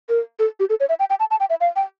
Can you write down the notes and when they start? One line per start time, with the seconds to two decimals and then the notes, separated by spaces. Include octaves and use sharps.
0.09 A#4
0.39 A4
0.60 G4
0.70 A4
0.80 C#5
0.89 E5
0.99 G5
1.10 G5
1.20 A5
1.31 A5
1.40 G5
1.50 E5
1.60 F5
1.76 G5